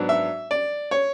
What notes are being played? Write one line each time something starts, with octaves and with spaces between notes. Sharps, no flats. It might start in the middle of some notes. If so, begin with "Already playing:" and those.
Already playing: G#2 F#3 B3 D4
E5
D5
C#5